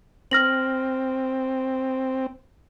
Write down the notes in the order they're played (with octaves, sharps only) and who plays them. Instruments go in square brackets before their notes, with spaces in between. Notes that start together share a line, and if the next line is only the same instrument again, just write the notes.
[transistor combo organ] C4 [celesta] F6 A#6 F#7